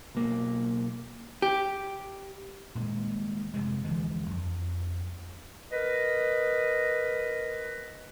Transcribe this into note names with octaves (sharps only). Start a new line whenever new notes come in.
B1 A#3
G4
D#1 A#2 G#3
F1 C3 G#3
D2 E3 F3 G#3
F2
A#4 B4 D#5